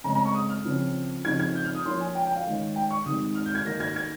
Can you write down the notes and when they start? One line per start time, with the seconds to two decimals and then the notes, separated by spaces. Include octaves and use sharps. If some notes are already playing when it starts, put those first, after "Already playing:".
0.04 C#3 G#3 C4 A#5
0.15 A#5
0.25 C#6
0.35 D#6
0.50 F6
0.65 C#3 F3 C4
1.25 C#3 F3 C4 D#4 G#6
1.40 G#6
1.55 G6
1.65 F6
1.75 D#6
1.85 F3 A#3 C#4 C6
2.00 G#5
2.15 G5
2.25 G5
2.35 F5
2.46 D#3 G#3 C#4
2.76 G5
2.91 C#6
3.06 C3 D#3 G#3 D#4 D#6
3.35 F6
3.46 G6
3.55 G#6
3.65 D#3 A#3 D#4 A#6
3.80 G#6
3.96 G#6